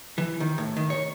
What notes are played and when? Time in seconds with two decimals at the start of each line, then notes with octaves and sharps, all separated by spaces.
0.18 E3
0.40 D#3
0.58 A2
0.77 D#3
0.90 C#5